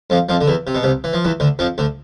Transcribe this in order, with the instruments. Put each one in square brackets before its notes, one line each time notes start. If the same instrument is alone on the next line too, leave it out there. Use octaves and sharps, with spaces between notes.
[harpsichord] F2 F3
F2 F3
D3
E2 E3
C3
B2
C2 C3
E3
F3
E2 E3
D2 D3
F2 F3
D2 D3